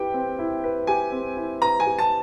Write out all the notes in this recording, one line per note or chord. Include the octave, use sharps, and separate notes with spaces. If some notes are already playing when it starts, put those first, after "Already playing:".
Already playing: E4 G4 B4 G5
C4
E4
B4
G4 G#5
C4
E4
B4 A#5
G#5
G4
A5